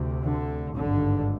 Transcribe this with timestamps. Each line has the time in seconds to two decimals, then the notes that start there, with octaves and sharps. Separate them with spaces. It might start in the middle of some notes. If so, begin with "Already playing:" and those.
Already playing: D2 C3
0.25 D3
0.76 G#1 G2 D3